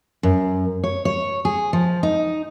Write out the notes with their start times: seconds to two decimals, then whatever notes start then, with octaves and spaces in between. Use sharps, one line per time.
0.23 F#2
0.84 C#5
1.05 C#5
1.45 G#4
1.73 F3
2.03 D#4